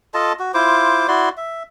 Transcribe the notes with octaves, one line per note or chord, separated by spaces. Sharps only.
F4 A4 D#5 A5
F#4
E4 F4 C5 D6
E4 F#4 D5 C6
E5